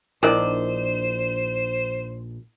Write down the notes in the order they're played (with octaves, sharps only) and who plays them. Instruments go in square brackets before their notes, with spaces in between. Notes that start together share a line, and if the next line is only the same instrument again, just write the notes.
[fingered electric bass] A#1 [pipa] D#3 D4 D5 [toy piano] E4 A#4 [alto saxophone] C5